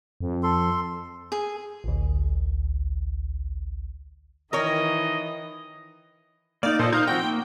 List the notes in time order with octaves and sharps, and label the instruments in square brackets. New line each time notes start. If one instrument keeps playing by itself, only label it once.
[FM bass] F2
[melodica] A4 C6
[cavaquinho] G#4
[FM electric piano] A1 D2
[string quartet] D#3 E3 [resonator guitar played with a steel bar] A#4 C#5 G5 [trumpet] D#5
[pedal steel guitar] A#3 D#4 [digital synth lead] D5
[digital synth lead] A#2 [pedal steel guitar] A4 C5 D#5
[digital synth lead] D#4 [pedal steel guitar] C5 F5
[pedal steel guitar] F3 C4 F#4 [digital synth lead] G5
[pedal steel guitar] A#3